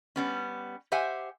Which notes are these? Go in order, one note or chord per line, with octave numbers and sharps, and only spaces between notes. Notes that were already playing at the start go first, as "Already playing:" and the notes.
G3 B3 C#4
G4 C5 E5 F#5 G#5